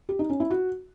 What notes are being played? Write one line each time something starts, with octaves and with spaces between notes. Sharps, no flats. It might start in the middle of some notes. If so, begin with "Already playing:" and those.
G4
D#4
C#4
E4
F#4